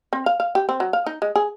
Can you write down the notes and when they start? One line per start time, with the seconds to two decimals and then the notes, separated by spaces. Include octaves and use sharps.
0.13 C4
0.26 F5
0.40 F5
0.55 G4
0.69 C4
0.80 F#3
0.93 F5
1.06 D#4
1.22 G#3
1.36 G#4